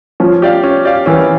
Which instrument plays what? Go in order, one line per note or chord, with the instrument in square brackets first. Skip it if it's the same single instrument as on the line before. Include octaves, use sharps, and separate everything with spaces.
[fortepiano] F3 [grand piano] C#4
[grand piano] G4 D5 F5
C#4
G4 D5 F5
[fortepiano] E3 [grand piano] C#4